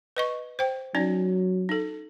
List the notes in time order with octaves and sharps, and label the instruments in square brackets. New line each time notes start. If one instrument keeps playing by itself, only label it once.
[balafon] B4 D#5 C#6
C5 G5
[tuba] F#3 [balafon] C#4 D#4 D5
[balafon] D#4 A4